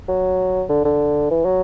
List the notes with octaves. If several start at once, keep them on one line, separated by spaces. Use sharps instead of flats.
F#3
D3
D3
E3
F#3